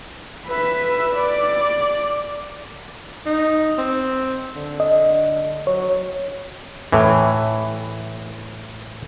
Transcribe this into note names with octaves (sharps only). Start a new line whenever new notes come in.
B4 E5
D5
D#4
C4
D3
D#5
F#3 C#5
A2 E3